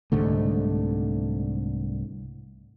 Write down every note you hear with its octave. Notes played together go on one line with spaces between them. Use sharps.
C2 G#2 D3 A3